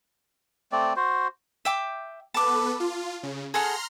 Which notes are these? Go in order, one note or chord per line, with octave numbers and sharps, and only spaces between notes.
A3 C4 D5
F#4 C5
E5 G5 D6
B3 A4 B4 A5 D6
F4
C#3
G#4 A4 F#5 A#5 C6 F6